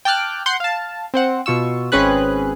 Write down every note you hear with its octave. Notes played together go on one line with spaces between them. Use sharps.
G5 A5 D6 F6 F#6
F#5 C6 G6
F5 A5
C4 C5 F#5
B2 F4 C#6 E6
G#1 C4 C#4 G#4 B4 F#6